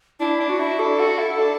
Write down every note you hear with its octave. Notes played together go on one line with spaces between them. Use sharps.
D4 E4
D4
F#4
E4
D4 A4
F#4
E4
D4